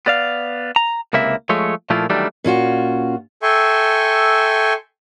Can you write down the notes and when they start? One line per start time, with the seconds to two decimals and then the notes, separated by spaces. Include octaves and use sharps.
0.06 B3 D5 F5
0.76 A#5
1.13 C#2 C3 A#3 E4 E5
1.49 F3 G#3 A3 C#5
1.90 A#2 F3 A3 A#3 E4 F4
2.10 D#3 E3 F#3 G3 A3 D4
2.44 A#2 C#4 F4 F#4
3.42 A4 E5 G5 G#5 C6 C#6